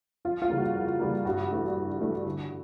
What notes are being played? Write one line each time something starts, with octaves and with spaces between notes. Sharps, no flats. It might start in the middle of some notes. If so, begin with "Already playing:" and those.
F2 F4
F4
C#3 E3 G3 A#3
F#4
F2
C#3 E3 G3 A#3
G2 F#4
E3 A3 D4
G2
E3 A3 D4
D3